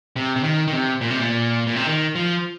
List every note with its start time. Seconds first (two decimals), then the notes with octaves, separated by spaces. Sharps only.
0.16 C3
0.36 C3
0.44 D#3
0.67 D#3
0.73 C3
1.01 A#2
1.10 C3
1.19 A#2
1.67 A#2
1.76 C3
1.87 D#3
2.15 F3